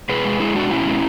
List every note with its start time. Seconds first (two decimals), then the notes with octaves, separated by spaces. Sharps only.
0.09 B2 G#4 B4
0.25 G#3
0.40 G#3 E4 G#4
0.55 B2 D4 F#4
0.71 B2 C#4 E4
0.86 G#3